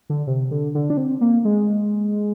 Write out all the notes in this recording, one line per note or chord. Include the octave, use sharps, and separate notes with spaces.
D3
C3
D3
D3
D4
C4
A#3
G#3